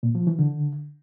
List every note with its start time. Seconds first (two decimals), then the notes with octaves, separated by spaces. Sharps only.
0.03 A#2
0.15 F3
0.27 E3
0.39 D3